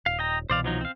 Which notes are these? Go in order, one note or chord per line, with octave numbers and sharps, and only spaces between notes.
D#1 F5
D#5 G5 A#5
C2 B2 E3 C5 D5 F5
F3 F#3 D#4
C4 F5